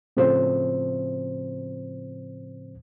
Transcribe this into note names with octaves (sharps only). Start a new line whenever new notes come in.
A2 C#3 F3 C4 C5